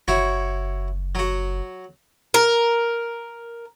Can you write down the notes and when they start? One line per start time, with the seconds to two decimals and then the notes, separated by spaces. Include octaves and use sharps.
0.08 F#1 E4 F#4 C#5
1.15 F#3 F#4
2.34 A#4